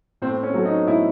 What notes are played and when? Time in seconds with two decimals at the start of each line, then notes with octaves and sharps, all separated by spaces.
0.22 A2 C4
0.43 C#4
0.54 F#3 A3
0.65 D#4
0.88 A2 E4